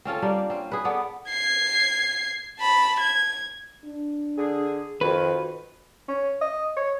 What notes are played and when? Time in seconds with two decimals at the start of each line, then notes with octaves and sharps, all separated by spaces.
0.05 C4 C#4 F4 A4
0.22 G3 A#3 D4
0.50 C4 C#4
0.72 G#4 B4
0.85 B3 A4 D5
1.29 G#6 C7
2.60 A5 B5
3.00 G#6
3.84 D4
4.38 D3 G#4
5.01 F2 D#3 F#4 B4
6.08 C#4
6.41 D#5
6.77 C#5